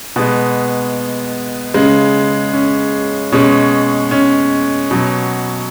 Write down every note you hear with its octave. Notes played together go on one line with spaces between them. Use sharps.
B2 G#3 B3
C#3 G#3
C#4
B2 G#3 C#4
C#4
B2 F#3